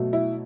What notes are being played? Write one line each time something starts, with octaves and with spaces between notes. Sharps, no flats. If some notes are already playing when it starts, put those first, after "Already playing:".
Already playing: B2 F#3 A3
E4